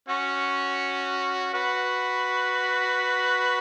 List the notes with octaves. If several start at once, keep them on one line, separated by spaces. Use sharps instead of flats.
C#4 F#4
F#4 B4